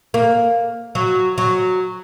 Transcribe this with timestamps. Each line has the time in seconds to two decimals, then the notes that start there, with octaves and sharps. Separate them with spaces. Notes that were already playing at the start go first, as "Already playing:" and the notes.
0.14 A#3
0.95 F#3
1.38 F#3